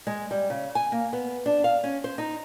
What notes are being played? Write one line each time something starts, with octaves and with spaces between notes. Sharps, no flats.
G#3
G3
C#3
G#5
A#3
B3
D4
F5
C#4
C5
D#4